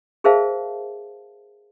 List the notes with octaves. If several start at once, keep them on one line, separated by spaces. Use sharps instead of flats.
G#4 A#4 C5 E5 F5 A5